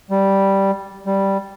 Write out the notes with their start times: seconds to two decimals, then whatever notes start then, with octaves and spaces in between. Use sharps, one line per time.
0.10 G3
1.06 G3